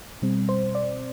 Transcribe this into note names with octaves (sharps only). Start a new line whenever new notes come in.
B2 G3 C4
C5
D5